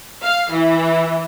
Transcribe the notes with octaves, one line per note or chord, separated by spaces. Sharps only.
F5
E3